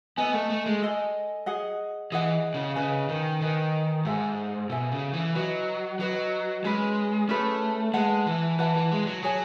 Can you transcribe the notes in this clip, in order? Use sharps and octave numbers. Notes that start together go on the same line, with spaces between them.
B3 A4 D#5 G#5
A3
A3
G#3
A4 D#5 G#5
G#4 D#5 F#5
E3 G#4 D#5 F#5
C#3
C#3 B4 D#5 G#5
D#3
D#3 B4 D#5 G#5
G#2 A4 E5 G#5
B2 A4 E5 G#5
C#3
E3
F#3 F#4 B4 D#5
F#3 F#4 B4 D#5
G#3 C#4 G#4 B4
A3 C#4 G#4 B4
G#3 B4 F#5 A5
E3
E3 B4 F#5 A5
E3
G#3
F#3
F#3 G#4 C#5 G#5